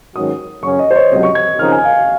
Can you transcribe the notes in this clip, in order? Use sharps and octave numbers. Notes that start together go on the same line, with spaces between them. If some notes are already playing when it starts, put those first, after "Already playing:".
G#2 D#3 F#3 C#4 F#4 D#6
F#2 C#3 F#3 C#4 C#6
D#5
C5
C#5
C#2 C3 F#3 D#5
C#6
G#6
C#3 F3 C4 D#4 A#4 F6
G#5
F5